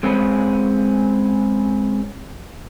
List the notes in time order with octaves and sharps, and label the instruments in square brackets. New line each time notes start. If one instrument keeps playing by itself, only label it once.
[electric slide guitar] G#3 C4 C#4 G#4 B4